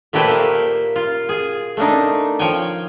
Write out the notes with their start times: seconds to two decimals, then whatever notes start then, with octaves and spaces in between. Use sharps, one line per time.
0.13 A#2 A3 E4 G4 B4 C5
0.28 A#3
0.96 F4
1.29 G#4
1.77 A3 A#3 D4 D#4
2.39 F3 C#5 G5 G#5